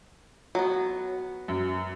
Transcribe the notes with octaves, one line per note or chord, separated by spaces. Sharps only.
F#3 B3
F#2